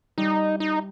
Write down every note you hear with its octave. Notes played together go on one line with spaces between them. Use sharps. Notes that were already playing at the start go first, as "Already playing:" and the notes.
G3 D#4
D#4